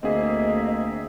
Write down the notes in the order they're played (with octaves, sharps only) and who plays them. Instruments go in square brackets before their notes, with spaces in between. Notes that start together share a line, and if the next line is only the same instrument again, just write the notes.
[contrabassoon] D2 [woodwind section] A#3 E5 [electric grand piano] C4 G#4 [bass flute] D#5